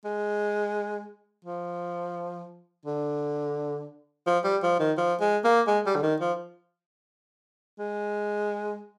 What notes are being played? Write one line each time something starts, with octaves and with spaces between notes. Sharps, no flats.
G#3
F3
D3
F3
G3
F3
D#3
F3
G#3
A#3
G#3
G3
D3
D#3
F3
G#3